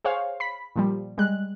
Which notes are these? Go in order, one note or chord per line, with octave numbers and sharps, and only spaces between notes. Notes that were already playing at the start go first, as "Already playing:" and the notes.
G#4 C5 C#5 F5
B5 B6
A#2 F3 G3
G3 G#3 F#6